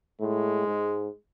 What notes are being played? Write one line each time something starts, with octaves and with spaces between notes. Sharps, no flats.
A2 G#3
G#2